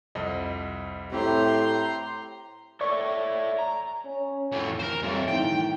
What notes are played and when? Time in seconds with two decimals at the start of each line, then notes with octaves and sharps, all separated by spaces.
0.15 C2 F2 D#5
1.12 A2 C4 E4 G4 C#5 A#5 C6
2.81 A4 C#5 D5 E5 C#6
3.59 A#5
4.05 C#4
4.52 F2 A2 G#5
4.80 A#4 C5
5.02 F2 G3 C#5 E5
5.28 A2 D#3 E3 G5